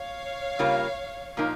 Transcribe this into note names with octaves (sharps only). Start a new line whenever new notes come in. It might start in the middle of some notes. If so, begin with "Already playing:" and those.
Already playing: C#5 F5
C#3 G3 A#3 F4
A#2 F3 A#3 D#4